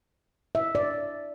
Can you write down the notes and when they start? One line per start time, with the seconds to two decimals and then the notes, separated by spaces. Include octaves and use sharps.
0.55 E5
0.75 D5